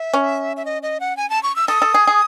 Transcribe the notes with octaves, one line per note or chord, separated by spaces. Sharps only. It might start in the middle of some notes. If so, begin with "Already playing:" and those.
Already playing: E5
C#4
E5
D#5
D#5
F#5
G#5
A5
C#6
E6
A4 D#6
A4
G#4
G#4